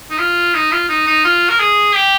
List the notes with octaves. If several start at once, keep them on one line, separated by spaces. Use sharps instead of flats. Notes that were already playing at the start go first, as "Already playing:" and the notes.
D#4
F4
D#4
F4
D#4
D#4
F4
A#4
G#4
G4